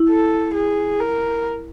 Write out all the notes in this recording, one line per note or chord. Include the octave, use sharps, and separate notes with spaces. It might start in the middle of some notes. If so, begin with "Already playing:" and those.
Already playing: E4
A4
G#4
A#4